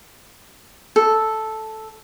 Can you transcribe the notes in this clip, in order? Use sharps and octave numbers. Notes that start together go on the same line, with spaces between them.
A4